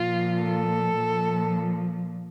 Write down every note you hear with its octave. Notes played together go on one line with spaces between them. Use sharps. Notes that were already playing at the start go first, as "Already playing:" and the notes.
Already playing: A#2 F3 F4
A4
A#2 F3